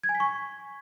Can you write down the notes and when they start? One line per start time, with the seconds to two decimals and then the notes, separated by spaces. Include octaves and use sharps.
0.04 G#6
0.09 G#5
0.15 B6
0.20 C#6